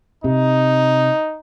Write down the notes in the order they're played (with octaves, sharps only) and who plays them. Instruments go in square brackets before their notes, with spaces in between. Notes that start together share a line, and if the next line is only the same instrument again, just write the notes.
[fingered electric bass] C3 [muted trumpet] D#4